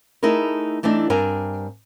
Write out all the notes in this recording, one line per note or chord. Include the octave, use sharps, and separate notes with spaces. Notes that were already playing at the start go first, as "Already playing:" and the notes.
A3 D#4 E4 G#4 A#4
E3 A3 C4 D4 D#4
G2 C4 D4 A#4 G#5